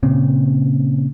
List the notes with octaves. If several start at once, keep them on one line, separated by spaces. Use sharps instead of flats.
A#2 C#3 C4